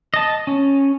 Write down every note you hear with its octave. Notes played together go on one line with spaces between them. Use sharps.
D#5 A5
C#4